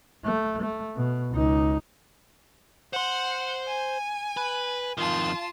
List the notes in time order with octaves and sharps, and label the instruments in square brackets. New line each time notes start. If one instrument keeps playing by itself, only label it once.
[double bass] A3
A3
B2
C#2 D#4
[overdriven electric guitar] C5 C6 [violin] F#5
[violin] G#5
[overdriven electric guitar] B4
[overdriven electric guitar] F2 D#3 [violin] F4 A5